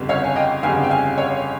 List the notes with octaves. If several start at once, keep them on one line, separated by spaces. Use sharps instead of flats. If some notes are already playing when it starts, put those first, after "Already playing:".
Already playing: G1 F2 C#3 G3
C#5 F5
G#5
D#5 G5
G1 F2 C#3 G3 F5 G#5
G5
F5 G#5
C#5 F5